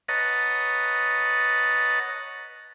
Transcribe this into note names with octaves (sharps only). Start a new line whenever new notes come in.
B4 C#5 D#5 F#5 A5 A#5